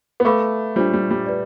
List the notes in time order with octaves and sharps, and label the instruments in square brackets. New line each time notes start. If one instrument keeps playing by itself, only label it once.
[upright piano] B3
[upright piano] A3 [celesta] B4 F5 B5 D6
[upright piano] G3 [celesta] D4 F4 C5
[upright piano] G3
G3
[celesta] B4 D5